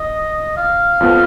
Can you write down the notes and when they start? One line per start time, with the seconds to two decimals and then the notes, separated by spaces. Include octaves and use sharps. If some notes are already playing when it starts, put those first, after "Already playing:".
Already playing: D#5
0.57 F5
1.00 F2 F3 B3